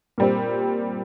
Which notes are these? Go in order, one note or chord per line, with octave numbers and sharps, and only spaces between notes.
A#2 G3 C4